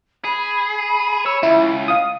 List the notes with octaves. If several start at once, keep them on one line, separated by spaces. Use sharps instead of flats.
G#4 B5
C#5 E6
C#2 E4
F5 D#6